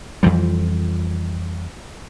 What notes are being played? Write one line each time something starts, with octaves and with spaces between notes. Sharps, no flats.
F2 E3 F3 G3